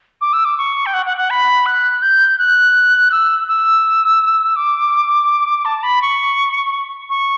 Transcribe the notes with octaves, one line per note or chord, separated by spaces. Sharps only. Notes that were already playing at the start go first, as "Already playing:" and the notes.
D6
E6
D6
C#6
G5
F#5
F#5
F#5
B5
F#6
G6
F#6
E6
E6
D6
A5
B5
C#6
C#6